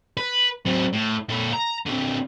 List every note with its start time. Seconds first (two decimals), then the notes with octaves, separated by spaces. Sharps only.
0.17 B4
0.66 F#3 C4
0.93 A2
1.29 A#2 A4
1.53 A#5
1.86 D3 C4